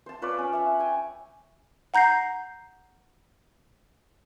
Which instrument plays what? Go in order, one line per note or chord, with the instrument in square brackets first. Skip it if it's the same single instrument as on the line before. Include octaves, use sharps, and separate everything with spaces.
[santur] C5 A5
F4 B4 C#5 D5
C#4
E5 A5
G5 G#5
[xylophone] F#5 A#5 G6 A#6 C7